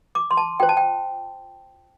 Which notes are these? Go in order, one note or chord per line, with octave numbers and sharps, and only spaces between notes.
D6
C6
A5
F4 C5 G5
A5
G5